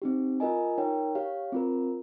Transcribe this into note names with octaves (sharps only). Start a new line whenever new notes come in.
C4 D#4 G4
F4 A#4 D#5 G#5
D#4 A#4 C#5 G5
G4 C#5 F5
C4 F4 A#4